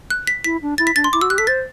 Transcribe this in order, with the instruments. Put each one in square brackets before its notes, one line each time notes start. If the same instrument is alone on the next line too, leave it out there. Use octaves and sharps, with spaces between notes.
[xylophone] F#6
B6
[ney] E4 [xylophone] B6
[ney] D4
[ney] E4 [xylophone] A6
[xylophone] B6
[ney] D4 [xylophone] A6
[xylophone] C6
[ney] E4 [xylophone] D6
[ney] F#4 [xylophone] E6
[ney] G4 [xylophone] F#6
[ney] A4 [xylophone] B6
[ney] C5 [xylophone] A6